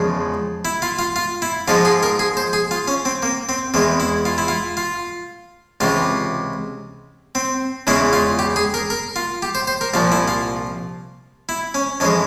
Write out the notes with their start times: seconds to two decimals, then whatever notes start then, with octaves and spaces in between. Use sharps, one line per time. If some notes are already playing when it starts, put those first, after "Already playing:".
Already playing: E2 C#3 F3 G#3
0.65 E4
0.82 F4
0.99 F4
1.16 F4
1.42 E4
1.68 G#2 F3 G#3 F4
1.85 G#4
2.03 A#4
2.19 G#4
2.37 C5
2.53 G#4
2.71 F4
2.88 C#4
3.05 C4
3.23 A#3
3.49 C4
3.74 E2 E3 G#3 C4
4.00 E4
4.25 F4
4.38 E4
4.48 F4
4.77 F4
5.80 C#2 C3 E3 F4
7.35 C4
7.87 E2 C#3 E3 G#3 E4
8.13 F4
8.39 G4
8.56 G#4
8.74 A#4
8.90 A#4
9.16 F4
9.42 G4
9.55 C5
9.67 C5
9.81 A#4
9.94 C2 A#2 F3 F4
10.12 E4
10.28 F4
11.49 E4
11.74 C#4
12.00 F2 E3 G#3 C#4